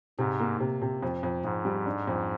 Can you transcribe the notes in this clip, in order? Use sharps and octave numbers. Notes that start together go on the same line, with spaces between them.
G#2 C3
A#3
C3
C3
F2
F2
F2 G#2
G3
D4
F2